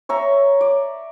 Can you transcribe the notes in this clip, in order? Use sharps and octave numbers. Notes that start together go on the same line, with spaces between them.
C#5 E5 A#5
D5